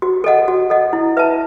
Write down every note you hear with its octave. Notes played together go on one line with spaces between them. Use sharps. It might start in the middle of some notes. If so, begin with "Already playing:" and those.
F#4
A4 D#5 F#5
F#4
A4 D#5 F#5
E4
B4 E5 A5